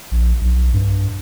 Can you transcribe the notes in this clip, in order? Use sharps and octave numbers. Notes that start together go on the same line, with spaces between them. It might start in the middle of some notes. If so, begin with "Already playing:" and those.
A#1
B1
G2